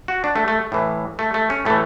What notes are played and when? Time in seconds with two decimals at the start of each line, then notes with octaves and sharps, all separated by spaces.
0.08 F#4
0.24 D4
0.36 A3
0.48 A3
0.72 A2 E3
1.19 A3
1.34 A3
1.50 C#4
1.65 A2 E3 A3